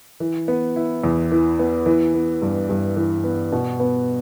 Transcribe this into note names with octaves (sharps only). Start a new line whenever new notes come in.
E3
B3
E4
E2
E3
B3
E3
B3
G2
G2
E3
B3
B2
B3